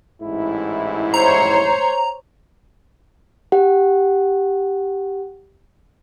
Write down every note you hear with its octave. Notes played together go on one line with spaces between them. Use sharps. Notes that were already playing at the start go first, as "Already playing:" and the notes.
A1 G#2 E4
C5 C#5 A#5
G4 F#5